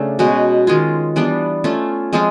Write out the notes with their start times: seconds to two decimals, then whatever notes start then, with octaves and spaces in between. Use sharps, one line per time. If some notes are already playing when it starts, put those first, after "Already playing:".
Already playing: C#3 A3 D4
0.19 B2 G#3 C#4 F#4
0.67 D#3 G#3 C#4 F4
1.16 E3 G3 B3 D4
1.64 A3 C#4 F4
2.13 F3 G#3 C4 F4